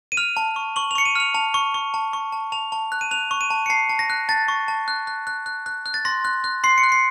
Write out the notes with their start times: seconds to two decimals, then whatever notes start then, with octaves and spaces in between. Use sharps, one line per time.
0.12 D#7
0.17 F6 F7
0.37 A5
0.56 C#6
0.76 C#6 F#7
0.91 F7
0.95 C#6 C#7
1.05 D#7
1.16 F6 F7
1.34 A5 F7
1.54 C#6
1.74 C#6
1.94 A5
2.13 C#6
2.32 A5
2.52 A5 F7
2.72 A5
2.92 F#6
3.01 D#7
3.11 F#6 F7
3.31 C#6
3.41 D#7
3.50 A5
3.66 C#7
3.70 A5 C7
3.89 A5
3.99 A#6
4.10 F#6
4.29 A5 A6
4.48 C#6
4.68 A5
4.88 F#6
5.07 F#6
5.27 F#6
5.46 F#6
5.66 F#6
5.86 F#6
5.94 A6
6.05 C6 A#6
6.25 F#6
6.44 F#6
6.64 C6 C7
6.78 C#7
6.83 F#6
6.92 C7